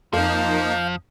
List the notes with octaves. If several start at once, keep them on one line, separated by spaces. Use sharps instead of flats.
F2 F3 A#3 D#4 F5 G6